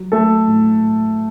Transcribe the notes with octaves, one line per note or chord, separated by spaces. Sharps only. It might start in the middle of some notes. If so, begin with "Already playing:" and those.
Already playing: F#3
F#3 A3 A4
A2
A2